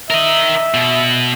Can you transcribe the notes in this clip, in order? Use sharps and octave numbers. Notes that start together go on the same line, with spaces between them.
A#4 D#5 E5
B2